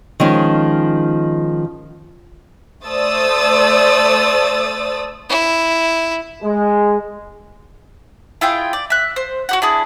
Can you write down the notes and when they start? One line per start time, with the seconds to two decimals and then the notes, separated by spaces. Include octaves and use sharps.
0.20 D#3 F3 G#3 C#4
2.84 A3 C5 D5 D#6 E6 A6
5.29 E4
6.42 G#3
8.41 E4 F4 G#4 G5
8.73 D5
8.90 E5 F#6
9.16 C5
9.49 F#4 G4 F#5
9.62 D4 E4 G#4